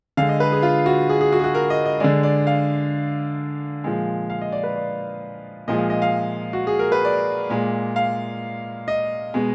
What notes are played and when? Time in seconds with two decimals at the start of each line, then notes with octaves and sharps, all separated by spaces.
0.17 D3 G#3 F5
0.29 D#5
0.40 B4
0.52 G#4
0.63 F4
0.86 F#4
1.09 G#4
1.21 G#4
1.32 F#4
1.39 G#4
1.44 F#4
1.55 A#4
1.70 D#5
1.85 D#5
2.00 D3 G#3 D5
2.23 D5
2.47 F5
3.84 A#2 F3 G#3
4.30 F5
4.41 D#5
4.52 D5
4.63 B4
4.76 D5
5.68 A#2 F3 G#3 D#5
5.78 F5
5.90 D#5
6.02 F5
6.53 F#4
6.67 G#4
6.79 A#4
6.92 B4
7.05 D5
7.50 A#2 G#3
7.96 F5
8.88 D#5
9.34 B2 G#3